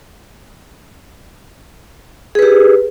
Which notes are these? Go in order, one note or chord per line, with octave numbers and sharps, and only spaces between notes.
G4 G#4 B4